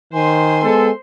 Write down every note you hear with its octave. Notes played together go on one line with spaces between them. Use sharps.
D#3 C5 G#5 C6
G#3 B3 A4